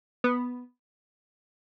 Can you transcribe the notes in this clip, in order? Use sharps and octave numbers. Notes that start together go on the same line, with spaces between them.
B3